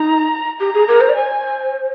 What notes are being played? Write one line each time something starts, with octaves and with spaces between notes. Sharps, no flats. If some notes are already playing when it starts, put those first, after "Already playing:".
Already playing: D#4 A#5
G4 A#5
G#4
A#4
C5
D5
C5 G#5